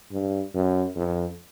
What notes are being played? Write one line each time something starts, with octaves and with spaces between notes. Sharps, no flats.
G2
F#2
F2